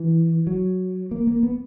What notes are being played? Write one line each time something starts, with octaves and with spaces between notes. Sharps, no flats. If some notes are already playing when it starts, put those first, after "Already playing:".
Already playing: E3
F#3
A#3
A#3
B3